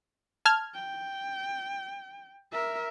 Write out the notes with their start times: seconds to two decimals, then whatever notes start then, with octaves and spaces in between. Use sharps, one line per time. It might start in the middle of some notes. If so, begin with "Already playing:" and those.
0.45 A5 F6 G#6
0.75 G5
2.52 A#4 E5